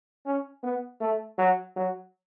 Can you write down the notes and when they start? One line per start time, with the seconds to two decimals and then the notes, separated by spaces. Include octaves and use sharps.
0.26 C#4
0.63 B3
1.01 A3
1.38 F#3
1.76 F#3